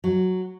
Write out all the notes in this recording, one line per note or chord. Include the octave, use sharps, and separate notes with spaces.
F#3